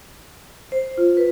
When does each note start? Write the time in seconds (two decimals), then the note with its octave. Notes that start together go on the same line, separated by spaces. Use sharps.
0.72 C5
0.98 F4
1.17 B4